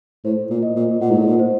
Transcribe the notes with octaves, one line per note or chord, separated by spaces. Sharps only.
A2 C5
A#2
D#5
A#2
A#2 F#5
G#2
A2
A#2
C5